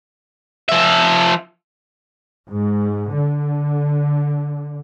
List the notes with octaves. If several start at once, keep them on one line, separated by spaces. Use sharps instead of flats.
F3 E5
G#2
D3